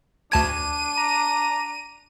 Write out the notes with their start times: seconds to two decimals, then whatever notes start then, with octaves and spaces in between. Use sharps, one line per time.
0.32 D2 D4 A5 G#6 D#7
0.98 A#5